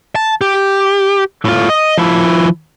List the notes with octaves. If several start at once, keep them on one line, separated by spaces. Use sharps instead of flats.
A5
G4
A2 F4
D#5
F3 E4